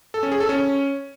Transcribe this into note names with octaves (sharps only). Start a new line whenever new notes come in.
A4
C#4
G#4
A4
C#4